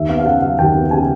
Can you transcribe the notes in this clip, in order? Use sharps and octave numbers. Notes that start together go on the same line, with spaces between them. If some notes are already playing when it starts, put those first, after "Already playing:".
Already playing: D#2 E5
B3 F5
F5
C#3 F#5
F#3 F5
D#2 G5
B3
C#3 G#5